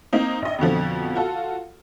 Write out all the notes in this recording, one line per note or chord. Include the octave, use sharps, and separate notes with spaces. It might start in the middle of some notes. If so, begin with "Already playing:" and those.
A#3 C4 D#4
A#1 D#5
F2 B2 D3 F3
F4 F#4 A4